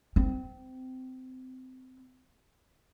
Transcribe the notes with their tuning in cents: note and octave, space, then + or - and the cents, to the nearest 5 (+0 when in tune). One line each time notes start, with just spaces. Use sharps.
C4 -25